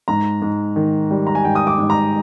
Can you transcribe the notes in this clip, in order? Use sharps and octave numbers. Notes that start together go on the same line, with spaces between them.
G#2 A#5
G#2
D#3
G3
A#5
G#5
G#2 G5
D#6
D6
G#2
A#5